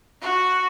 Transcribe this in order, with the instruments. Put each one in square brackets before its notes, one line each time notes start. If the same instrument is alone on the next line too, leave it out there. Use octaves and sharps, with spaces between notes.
[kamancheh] F#4